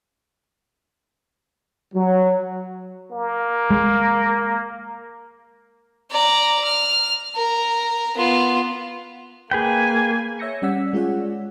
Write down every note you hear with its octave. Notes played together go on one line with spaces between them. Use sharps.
F#3
A#3
G#3
D5 A#5
F6
A#4
B3 F4
A#3 G#4 B4 G5 G#5
C#5 E5 E6 G6 A#6 C#7
G3 C#4 D5 F#5 E6 B6
G#3 F4 G#4 C#5 D5 F#5